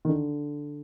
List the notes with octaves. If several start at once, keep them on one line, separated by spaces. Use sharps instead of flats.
D#3
D3